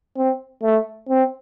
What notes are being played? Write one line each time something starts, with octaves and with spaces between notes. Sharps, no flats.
C4
A3
C4